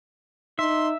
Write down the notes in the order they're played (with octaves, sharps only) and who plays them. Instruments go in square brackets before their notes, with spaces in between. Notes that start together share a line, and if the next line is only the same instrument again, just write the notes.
[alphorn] D#4 [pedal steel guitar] E5 [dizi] C6